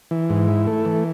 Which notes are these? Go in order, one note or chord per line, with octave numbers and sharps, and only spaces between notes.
E3
G#2
E4
A3
E3